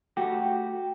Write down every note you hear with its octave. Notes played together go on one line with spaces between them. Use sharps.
A3 F#4 G4 G5